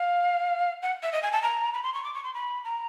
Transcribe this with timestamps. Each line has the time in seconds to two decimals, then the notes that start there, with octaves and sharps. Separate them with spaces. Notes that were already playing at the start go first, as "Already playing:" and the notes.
Already playing: F5
0.82 F#5
1.03 E5
1.13 D#5
1.23 G#5
1.32 A5
1.42 A#5
1.74 B5
1.83 C6
1.94 C#6
2.04 D6
2.14 C#6
2.24 C6
2.34 B5
2.64 A#5